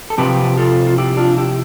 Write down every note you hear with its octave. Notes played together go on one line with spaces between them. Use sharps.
A4
C3 F3 C4 G4 B4
F4 A4
F4
E4 G4
D4 F4
E4 G4